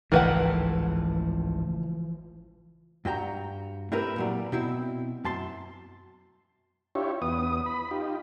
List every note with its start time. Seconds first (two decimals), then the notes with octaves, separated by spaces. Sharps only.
0.12 G#1 C#2 A2 E3 F3 A#4 B4 F#5
3.05 G2 F#4 G5 A#5
3.92 A3 C4 E4 G4 A#4 B4
4.16 A#2 F#3 G3
4.52 B2 C4 E4
5.24 F#2 A5 C6
6.95 D4 E4 F4 G4 C#5
7.22 E2 B3 D#6
7.66 B5
7.91 D#4 F4 G4